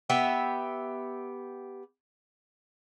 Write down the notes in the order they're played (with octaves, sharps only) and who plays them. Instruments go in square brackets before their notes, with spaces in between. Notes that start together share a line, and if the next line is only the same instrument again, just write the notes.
[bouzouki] B3 G4 E5